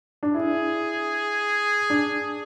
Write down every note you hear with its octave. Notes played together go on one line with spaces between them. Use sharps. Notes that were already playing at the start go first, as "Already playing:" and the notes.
D4
E4 G#4
D4